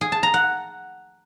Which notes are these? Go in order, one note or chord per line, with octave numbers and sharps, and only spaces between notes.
G#4
A5
A#5
F#5